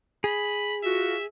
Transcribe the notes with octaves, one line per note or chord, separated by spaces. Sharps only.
G#4 B5
F4 F#4 E5